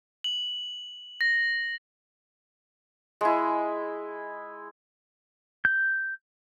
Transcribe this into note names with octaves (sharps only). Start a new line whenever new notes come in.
F#7
A#6
G#3 E4
G6